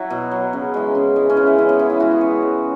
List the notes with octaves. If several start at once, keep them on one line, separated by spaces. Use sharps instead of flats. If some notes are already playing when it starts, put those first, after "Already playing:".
Already playing: F#3 E4 F#4
B2
F#3
C#3
E3 G#3
C#3
E3 G#3
C#4
C#3 E4
E4
E3 G#3 C#4
B3
C#3 E4
E4
E3 G#3 F#4
G#4
C#3 C#5
G#3